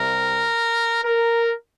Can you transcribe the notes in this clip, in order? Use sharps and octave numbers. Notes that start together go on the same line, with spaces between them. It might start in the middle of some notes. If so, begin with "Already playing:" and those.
Already playing: C2 C3 G3 A#4
A#4